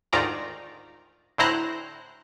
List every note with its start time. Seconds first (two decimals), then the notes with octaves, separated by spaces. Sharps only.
0.13 D2 G#2 D#3 F4 D5 A#5
1.38 D2 A2 E4 C5 A#5 F#6